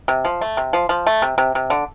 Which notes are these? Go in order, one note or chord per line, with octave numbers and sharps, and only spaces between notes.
C3
F3
A3
C3
F3
F3
A3
C3
C3
C3
D3